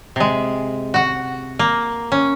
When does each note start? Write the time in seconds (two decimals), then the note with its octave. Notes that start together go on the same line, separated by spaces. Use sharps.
0.16 C3 G#3
0.94 F#4 F#5
1.59 A#3
2.12 C#4